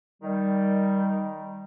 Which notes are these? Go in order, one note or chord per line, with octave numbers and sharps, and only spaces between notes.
D#3 G3